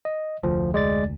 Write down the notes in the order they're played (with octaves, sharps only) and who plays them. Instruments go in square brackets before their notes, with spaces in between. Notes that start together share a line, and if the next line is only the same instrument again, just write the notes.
[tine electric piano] D#5
[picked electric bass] F1 D2 [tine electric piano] F3
[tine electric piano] G#3 D5 A6